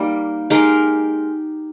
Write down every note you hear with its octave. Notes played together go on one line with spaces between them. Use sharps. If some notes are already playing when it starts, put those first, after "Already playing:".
Already playing: G3 A#3 D#4
G#3 D#4 G4 A#4